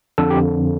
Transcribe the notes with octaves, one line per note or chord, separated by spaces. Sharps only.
F2 D3 A4
G4